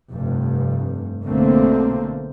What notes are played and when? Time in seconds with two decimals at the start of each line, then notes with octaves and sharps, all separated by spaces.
0.11 F1 G2
1.24 B1 B2 D3 A3 A#3 C4